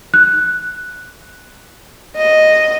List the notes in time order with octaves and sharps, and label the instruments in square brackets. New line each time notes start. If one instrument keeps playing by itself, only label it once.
[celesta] F#6
[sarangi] D#5